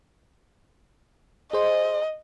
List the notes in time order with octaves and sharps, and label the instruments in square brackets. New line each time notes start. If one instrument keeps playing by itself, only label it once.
[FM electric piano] G#4 C5 [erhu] D#5